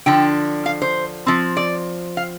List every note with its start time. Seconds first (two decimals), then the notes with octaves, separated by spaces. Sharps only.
0.06 D3 F3 D4 G5
0.66 F5
0.82 C5
1.27 F3 C4
1.57 D5
2.17 F5